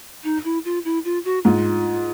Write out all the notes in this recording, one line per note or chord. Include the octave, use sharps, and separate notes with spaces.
D#4
E4
F4
E4
F4
F#4
G#2 F4